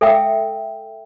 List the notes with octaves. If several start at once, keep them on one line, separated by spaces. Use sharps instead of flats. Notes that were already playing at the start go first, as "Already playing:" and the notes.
A4 E5 F5 G5 E6